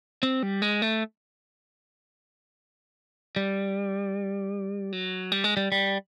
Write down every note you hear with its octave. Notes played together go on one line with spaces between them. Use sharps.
C4
G3
G#3
A3
G3
F#3
G3
G#3
G3
G3